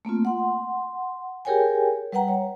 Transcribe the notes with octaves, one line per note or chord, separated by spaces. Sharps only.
A3 A#3 C4 F4
F#5 C6
G4 G#4 A#4 C#5 G5 G#5
G3 B4 F#5 G5 A#5
C#5